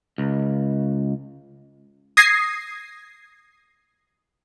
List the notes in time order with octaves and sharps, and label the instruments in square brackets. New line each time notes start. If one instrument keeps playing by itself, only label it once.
[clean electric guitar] C#2
[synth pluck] D#6 G#6 A#6 C7